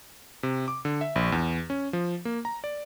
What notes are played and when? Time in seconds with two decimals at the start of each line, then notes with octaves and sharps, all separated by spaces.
0.43 C3
0.68 D6
0.85 D3
1.01 E5
1.16 A#1
1.32 E2
1.70 C#4
1.93 F3
2.25 A#3
2.45 A#5
2.64 D5